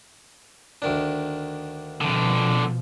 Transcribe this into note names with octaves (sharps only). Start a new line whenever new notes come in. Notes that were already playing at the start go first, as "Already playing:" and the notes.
D2 D#3 D4
F2 B2 D3 F3